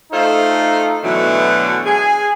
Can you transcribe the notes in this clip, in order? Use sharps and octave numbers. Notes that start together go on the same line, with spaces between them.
A3 D#4 F4 A4 C5
B2 D3 E3 F#3 A3
G#4 G#5